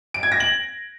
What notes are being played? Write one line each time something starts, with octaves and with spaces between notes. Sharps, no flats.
D7
G#6
A#6
F#7